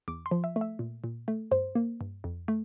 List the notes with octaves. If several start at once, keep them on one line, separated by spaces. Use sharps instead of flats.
E2 D6
C6
F3
E5
A3
E5
A#2
A#2
A3
G2 C5
A#3
G2
F2
A3